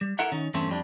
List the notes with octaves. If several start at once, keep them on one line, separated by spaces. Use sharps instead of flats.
G3
E4 A4 A#4 E5 F#5
D#3 C#4
E2 G2 A3 C4 C#4
F2 G3 D4